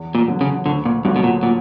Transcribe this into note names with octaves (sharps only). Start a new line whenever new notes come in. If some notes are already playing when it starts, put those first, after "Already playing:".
Already playing: E2
A#2
D3 F#3 B3
C#3
D2 D3
A#2
G2 D3 F#3 B3 F#4
B2
A#2
A#2